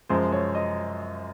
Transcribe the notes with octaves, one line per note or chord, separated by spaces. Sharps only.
F#2 F3 G#3 C5
C#5
D#5